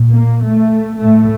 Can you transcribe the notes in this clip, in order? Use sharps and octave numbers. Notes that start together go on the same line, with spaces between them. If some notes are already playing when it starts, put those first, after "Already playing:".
Already playing: A#2
A#3
A3
A2 A3